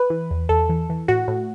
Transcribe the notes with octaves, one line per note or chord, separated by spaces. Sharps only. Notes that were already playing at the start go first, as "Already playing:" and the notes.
Already playing: B4
E3
E2
E2 A4
E3
E3
A2 F#4
A2